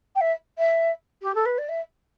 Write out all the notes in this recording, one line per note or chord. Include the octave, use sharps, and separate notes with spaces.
G5
E5
E5
G4
A4
B4
D5
E5